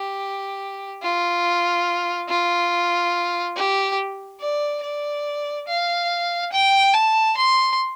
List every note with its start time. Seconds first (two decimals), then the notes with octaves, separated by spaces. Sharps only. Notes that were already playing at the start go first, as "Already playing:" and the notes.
Already playing: G4
1.03 F4
2.29 F4
3.56 G4
4.40 D5
4.83 D5
5.68 F5
6.53 G5
6.94 A5
7.37 C6